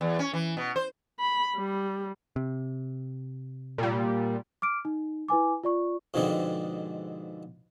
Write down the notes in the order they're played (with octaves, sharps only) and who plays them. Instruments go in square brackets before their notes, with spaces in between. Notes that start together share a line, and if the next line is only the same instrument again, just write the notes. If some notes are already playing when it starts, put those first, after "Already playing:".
[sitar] E2
C#4
E3
B2
C5
[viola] B5
G3
[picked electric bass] C3
[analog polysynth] A#2 G3
[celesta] D6 F6 D7
D#4
E4 B4 G#5 D6
F4 D5 C#6
[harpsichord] F2 G#2 B2 D3 G#3 C4